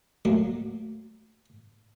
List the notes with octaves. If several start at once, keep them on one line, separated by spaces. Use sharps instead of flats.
F#3 A3 A#3